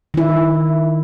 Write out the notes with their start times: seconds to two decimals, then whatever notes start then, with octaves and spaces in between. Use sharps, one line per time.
0.14 D#3 E4